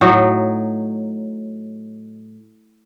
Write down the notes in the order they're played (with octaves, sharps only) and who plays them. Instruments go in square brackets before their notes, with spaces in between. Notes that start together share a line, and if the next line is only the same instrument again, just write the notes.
[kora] A2 F#3 D#4